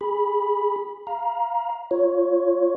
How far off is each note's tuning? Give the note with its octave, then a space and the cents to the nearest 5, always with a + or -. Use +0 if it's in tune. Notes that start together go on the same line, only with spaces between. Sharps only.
G#4 -15 B5 -10
F5 +0 A#5 +25
F4 +0 C#5 +0